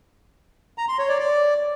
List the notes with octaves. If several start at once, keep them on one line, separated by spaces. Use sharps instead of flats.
A#5
C6
C#5
D5
D5